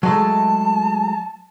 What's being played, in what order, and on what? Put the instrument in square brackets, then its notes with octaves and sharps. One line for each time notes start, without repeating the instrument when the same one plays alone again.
[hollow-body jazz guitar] F#3 G#3 A3 [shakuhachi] A5